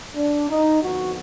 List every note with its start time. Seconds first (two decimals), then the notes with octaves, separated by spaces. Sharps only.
0.16 D4
0.49 D#4
0.82 F2 D3 F3 B3 F#4